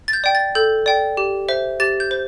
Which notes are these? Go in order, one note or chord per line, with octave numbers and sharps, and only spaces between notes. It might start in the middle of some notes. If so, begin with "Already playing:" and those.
A6
G6
D5 G5
A6
A4 G6
D5 G5
G4
C5 E5
G4 A6
G6
C5